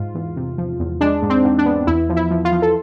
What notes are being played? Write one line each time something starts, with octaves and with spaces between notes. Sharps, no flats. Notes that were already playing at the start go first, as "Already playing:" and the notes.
Already playing: G#2 F4
E2
C3
F3
E2
G#3 D4
G#2
C4
G#2
D4
B3
E2 E4
F3
E4
F3
F4
F3
A4